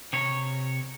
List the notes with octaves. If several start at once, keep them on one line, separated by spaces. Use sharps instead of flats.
C3 C#5